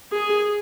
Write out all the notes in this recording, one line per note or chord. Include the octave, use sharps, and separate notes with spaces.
G#4